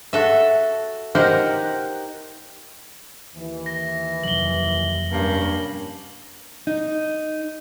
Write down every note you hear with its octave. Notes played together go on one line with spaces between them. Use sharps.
F#4 A4 E5
D#4 G4 A#4 C5 F#5
D#2 E3
A#6
F2 C3 F#3 F#7 G7
G2 A#3 C#4
D#4